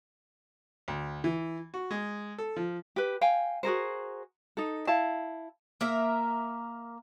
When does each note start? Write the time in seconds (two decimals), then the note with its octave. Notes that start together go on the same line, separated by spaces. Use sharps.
0.88 D2
1.24 E3
1.74 F#4
1.91 G#3
2.38 A4
2.56 F3
2.96 G4 B4
3.21 F5 G5 G#5
3.63 F#4 G#4 A#4 C5
4.57 D#4 A4
4.87 E4 F5 A5
5.81 A#3 A#4 E5